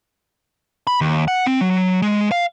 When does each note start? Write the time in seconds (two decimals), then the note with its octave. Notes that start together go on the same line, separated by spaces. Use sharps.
0.87 B5
1.01 D#2
1.28 F#5
1.47 C4
1.61 F#3
2.02 G#3
2.32 F5